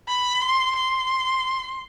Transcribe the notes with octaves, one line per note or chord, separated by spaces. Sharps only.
B5
C6
C6